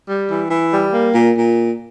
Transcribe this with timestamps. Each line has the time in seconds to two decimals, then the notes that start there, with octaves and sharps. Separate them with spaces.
0.07 G3
0.28 E3
0.49 E3
0.71 G3
0.92 A#3
1.13 A#2
1.35 A#2